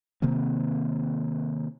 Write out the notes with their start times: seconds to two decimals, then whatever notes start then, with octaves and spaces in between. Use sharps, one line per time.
0.22 C3 D#3 A#3 C4